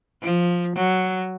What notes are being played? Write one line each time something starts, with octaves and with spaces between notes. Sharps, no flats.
F3
F#3